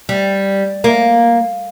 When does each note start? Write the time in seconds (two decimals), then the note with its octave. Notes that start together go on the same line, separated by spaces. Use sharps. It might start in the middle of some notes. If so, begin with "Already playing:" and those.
0.09 G3
0.84 A#3